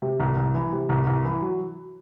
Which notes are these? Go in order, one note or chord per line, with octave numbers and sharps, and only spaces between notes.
C3
C2
C2
E3
C3
C2
C2
E3
F#3